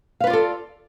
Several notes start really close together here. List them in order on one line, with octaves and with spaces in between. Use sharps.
F5 B4 F4 D5 A4